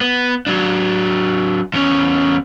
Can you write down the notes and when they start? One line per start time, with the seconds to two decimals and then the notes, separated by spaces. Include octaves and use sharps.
0.01 B3
0.47 F#3 D4
1.74 E2 C#4